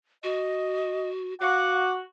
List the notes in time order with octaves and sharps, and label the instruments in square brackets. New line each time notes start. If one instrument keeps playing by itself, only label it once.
[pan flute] F#4 [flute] D#5
[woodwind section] F#4 [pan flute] F5 [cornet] F#5 [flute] D6